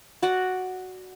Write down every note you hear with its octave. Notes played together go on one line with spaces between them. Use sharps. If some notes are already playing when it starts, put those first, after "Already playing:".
F#4 D5 F#5